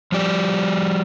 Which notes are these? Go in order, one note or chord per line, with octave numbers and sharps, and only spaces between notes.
F3 G3 D5